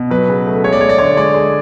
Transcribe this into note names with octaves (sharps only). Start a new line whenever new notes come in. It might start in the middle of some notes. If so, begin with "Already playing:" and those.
Already playing: B2
F#3 B4
C#3
A3
G#3 C#5
D5
G#3 C#5
D5
D3 C#5
G#3 D5
G#3